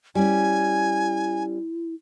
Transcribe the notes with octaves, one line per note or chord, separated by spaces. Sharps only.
G3 C#4 E4 G#5